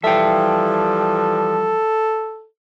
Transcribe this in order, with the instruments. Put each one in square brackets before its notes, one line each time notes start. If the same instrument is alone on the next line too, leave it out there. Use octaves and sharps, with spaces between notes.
[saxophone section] E3 F3 G3 [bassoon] A4 [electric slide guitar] E5 G5